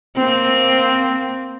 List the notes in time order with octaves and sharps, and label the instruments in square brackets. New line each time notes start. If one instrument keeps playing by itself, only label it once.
[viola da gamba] A#3 C4